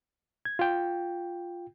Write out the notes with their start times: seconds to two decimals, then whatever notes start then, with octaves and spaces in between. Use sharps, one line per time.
0.45 G#6
0.59 F4 G5